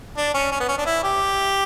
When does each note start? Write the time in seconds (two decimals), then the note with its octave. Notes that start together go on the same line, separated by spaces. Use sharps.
0.17 D4
0.34 C#4
0.52 C#4
0.60 B3
0.69 C#4
0.78 D4
0.86 E4
1.03 G4